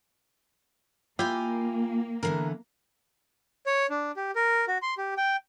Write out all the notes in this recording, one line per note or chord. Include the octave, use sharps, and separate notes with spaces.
A#3 E4 F4 G4 G#5
D3 E3 B3 A#4
C#5
D4
G4
A#4
F#4
C6
G4
G5